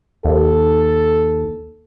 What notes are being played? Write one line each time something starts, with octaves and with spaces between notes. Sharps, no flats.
D#2 A4